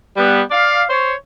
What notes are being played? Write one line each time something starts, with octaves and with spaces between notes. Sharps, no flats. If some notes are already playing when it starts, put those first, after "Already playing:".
G3 B3
D5 F5
C5 C#5